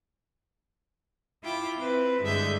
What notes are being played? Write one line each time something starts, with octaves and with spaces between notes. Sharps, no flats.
E4 F4 G5 D6
C4 E4 B4
G2 D3 G#3 E5 G6